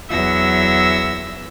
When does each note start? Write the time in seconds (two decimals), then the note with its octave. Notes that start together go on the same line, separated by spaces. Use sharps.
0.10 E2 F#3 E5 E6 A#6